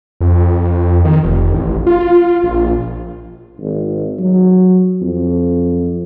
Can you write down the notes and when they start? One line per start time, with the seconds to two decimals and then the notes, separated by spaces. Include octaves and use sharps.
0.21 F2
1.05 D#3
1.24 F1
1.54 A1
1.87 F4
2.44 A#1
3.60 G#1
4.19 F#3
5.02 F2